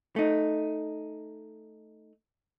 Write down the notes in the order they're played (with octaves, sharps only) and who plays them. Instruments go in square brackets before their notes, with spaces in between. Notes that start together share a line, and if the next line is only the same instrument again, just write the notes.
[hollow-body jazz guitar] A3 D#4